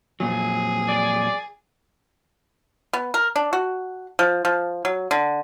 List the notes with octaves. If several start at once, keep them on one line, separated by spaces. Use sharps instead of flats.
F2 A#2 F#3 G#4
D5
B3
A#4
D4
F#4
F3
F3
F#3
D3